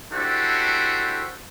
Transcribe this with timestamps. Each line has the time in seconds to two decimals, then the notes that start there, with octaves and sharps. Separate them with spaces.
0.13 D4 E4 F#4 G4 A4 C5